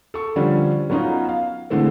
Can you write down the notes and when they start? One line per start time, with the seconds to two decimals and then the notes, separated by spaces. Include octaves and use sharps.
0.14 A4 C#6
0.36 D3 F3 G3 C#4 D4
0.90 F#3 B3 C#4 D#4 F4
1.29 F5
1.70 D3 E3 G#3 A3 C4